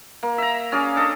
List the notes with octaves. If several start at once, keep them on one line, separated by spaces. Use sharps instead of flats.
A#3
E5 A#5
C#4 G#4 D5 F5
D4 A4 D#5